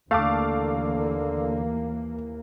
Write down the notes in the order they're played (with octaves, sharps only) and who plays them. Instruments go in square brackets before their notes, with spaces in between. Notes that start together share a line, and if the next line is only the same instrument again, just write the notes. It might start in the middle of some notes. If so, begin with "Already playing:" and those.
[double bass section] D#2 E3 A#3 [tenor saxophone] D3 [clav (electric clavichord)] A3 [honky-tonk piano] F5 A5 D6